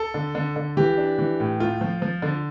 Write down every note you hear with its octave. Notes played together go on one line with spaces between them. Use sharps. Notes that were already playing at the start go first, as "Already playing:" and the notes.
Already playing: A4
D3
D3
D3
E3 G4
D4
E3
A2
A3 F4
F3
F3
D3